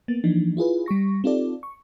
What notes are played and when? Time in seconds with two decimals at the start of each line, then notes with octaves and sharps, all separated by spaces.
0.08 A#3 B3 A6
0.24 E3 F3 A#3 D4 D#4
0.57 E4 F4 G#4 B4
0.86 G3 G4 C#6 A#6
1.24 C4 D#4 F4 G4 A4 D5
1.63 C#6